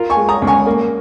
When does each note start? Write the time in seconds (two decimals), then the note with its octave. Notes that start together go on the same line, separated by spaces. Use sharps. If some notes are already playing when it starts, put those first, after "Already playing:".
Already playing: F4 A#4
0.10 G#5 C#6
0.17 G#3
0.29 A#5 D#6
0.42 C#2
0.47 G#5 C#6
0.66 A#3